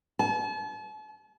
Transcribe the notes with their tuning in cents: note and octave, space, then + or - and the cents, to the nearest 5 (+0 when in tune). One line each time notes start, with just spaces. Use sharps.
A5 -40